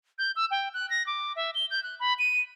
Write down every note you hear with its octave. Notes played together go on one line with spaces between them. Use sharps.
G6
E6
G5
F#6
A#6
D6
E5
G7
G6
F#6
B5
D#7